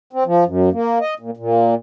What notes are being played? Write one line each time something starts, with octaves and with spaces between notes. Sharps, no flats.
C4
F3
F#2
A#3
D#5
A#2
A#2